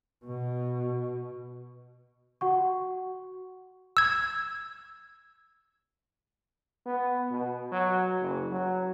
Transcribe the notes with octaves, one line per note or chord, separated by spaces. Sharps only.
B2
F#4 F#5 C#6
E6 G#6
B3
B2
F#3
F#1
F#3